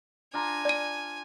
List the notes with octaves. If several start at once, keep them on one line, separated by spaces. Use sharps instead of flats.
D4 F4 G#5 A#5
D5 D#7